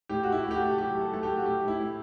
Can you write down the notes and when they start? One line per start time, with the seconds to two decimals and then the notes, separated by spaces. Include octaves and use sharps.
0.09 A2 G4
0.23 A3 F#4
0.32 E4
0.44 A3
0.51 G4
0.54 F#4
0.61 A3
0.77 F#3 G4
0.95 A3
1.01 A4
1.12 A3 A4
1.23 G4
1.28 A3
1.37 F#4
1.45 A2 G4
1.63 A2 E4
1.80 A2